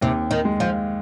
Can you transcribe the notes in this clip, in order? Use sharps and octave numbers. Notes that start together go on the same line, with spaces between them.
D#2 C3
D#3
G#3
F3